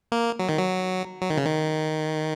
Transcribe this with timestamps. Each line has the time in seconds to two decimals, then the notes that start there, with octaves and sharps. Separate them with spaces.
0.12 A#3
0.39 F#3
0.49 D#3
0.58 F#3
1.22 F#3
1.30 D#3
1.37 C#3
1.46 D#3